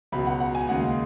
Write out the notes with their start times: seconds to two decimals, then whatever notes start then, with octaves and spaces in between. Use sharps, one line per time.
0.12 C#2 B2 F#3 B5
0.26 F#5
0.40 F#5
0.55 G#5
0.69 D#2 C#3 G#3 F#5